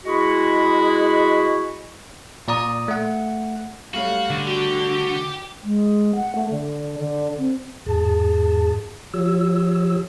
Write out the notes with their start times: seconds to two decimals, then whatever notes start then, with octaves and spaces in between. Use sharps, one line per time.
0.05 G#3 E4 F#4
2.48 A#2 D5 A#5 D#6
2.88 A3 F#5
3.94 G3 A3 C#4 F#4 F5
4.30 D3
4.47 F#4 G4
5.63 G#3
6.15 F#5
6.35 A3
6.50 D3
6.98 D3
7.38 C4
7.86 E2 G#2 G#4 A5
9.14 F3 F4 G4 C#5 E6